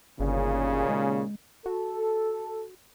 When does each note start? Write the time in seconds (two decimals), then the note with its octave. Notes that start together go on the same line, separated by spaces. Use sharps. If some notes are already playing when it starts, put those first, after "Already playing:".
0.20 G1 D#2 A#2 C#3
0.89 G#3
1.66 F#4 A4